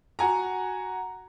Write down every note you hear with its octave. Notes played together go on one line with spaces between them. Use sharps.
F#4 F#5 G#5 A#5